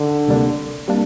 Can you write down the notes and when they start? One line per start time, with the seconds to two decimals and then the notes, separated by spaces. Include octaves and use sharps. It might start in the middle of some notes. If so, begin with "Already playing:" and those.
Already playing: D3
0.28 D2 C3 G3 A#3 D4
0.88 C3 G3 A#3 D4